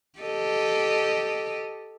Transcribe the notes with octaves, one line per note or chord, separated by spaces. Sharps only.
G4 A4 D#5